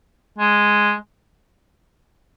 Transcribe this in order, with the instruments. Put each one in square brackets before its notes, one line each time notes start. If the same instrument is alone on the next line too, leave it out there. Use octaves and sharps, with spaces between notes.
[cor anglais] G#3